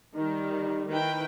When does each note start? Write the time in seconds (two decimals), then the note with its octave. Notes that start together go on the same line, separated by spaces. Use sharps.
0.15 D#3 G3
0.89 D#3 E4 B4 G5